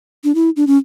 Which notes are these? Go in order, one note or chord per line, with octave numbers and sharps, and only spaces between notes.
D4
E4
D4
C#4